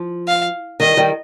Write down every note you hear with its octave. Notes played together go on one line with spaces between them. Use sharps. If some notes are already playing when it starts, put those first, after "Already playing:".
Already playing: F3
F5
D#3 G3 D#5
D#3 G3